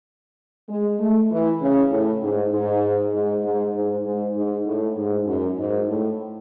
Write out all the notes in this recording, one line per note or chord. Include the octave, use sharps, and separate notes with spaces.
G#3
A3
E3
C#3
A2
G#2
G#2
G#2
G#2
G#2
G#2
G#2
A2
G#2
F#2
G#2
A2